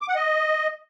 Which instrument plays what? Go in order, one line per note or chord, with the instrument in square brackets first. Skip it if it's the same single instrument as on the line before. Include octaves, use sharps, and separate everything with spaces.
[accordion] D6
F#5
D#5